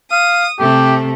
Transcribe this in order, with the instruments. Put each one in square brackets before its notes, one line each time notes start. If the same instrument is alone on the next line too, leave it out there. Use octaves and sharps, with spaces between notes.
[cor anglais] F5 [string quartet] D#6
[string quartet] C3 A3 [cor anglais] G4